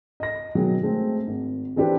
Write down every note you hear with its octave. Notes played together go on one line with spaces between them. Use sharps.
D#5 A#6
B2 D#3 F#3 G#4
G#3 A3 C4
G#1
E3 C4 D4 G4 A4 B4